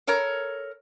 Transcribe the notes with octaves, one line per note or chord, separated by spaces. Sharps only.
A4 A#4 C#5 A#5